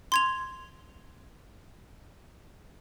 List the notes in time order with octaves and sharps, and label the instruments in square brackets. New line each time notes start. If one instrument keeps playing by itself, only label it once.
[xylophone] C6 G#6 F7